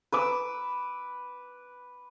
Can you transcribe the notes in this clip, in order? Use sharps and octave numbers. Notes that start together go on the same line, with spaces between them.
B4 D6 E6